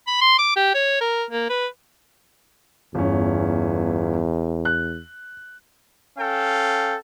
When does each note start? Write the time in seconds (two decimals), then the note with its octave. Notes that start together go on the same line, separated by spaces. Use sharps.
0.07 B5
0.21 C6
0.38 D6
0.56 G4
0.75 C#5
1.01 A#4
1.31 A#3
1.49 B4
2.95 G1 E2 C#4
4.65 F#6
6.17 C#4 A4 F5 G5